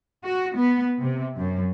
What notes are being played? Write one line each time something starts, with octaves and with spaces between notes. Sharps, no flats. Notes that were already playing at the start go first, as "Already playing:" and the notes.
F#4
B3
C3
F#2